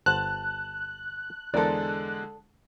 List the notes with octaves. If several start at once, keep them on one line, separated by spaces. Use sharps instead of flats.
G1 C5 F#5 A5 F#6
E2 D3 G#3 A4 A#4 C5 D5